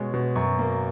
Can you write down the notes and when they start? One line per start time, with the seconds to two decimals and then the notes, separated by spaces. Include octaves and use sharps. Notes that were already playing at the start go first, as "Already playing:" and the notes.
Already playing: B2 G#3 C#4
0.14 B2
0.36 F#2 C#6
0.59 A#3